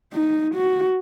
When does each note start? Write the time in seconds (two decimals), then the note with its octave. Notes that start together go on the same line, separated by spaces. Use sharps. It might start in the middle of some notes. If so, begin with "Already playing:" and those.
0.13 D#4
0.55 F#4